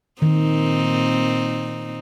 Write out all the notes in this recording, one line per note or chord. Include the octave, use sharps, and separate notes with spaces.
A#2 D#3 C4 D#4